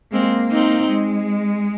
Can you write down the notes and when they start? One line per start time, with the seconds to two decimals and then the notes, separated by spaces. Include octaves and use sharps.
0.12 G#3 A#3 C4
0.51 C4 D#4
0.88 G#3